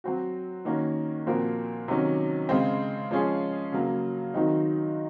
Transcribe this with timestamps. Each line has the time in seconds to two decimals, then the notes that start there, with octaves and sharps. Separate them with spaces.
0.04 F#3 C4 F#4
0.65 D#3 A#3 C#4 F#4 A#4
1.27 A#2 F3 C4 F#4 A#4
1.88 C3 D#3 F#3 C#4
2.49 C#3 G#3 C4
3.11 F3 G#3 C#4 F4 G#4
3.72 C#3 F#3 A#3
4.34 D#3 F#3 C4 D#4 F#4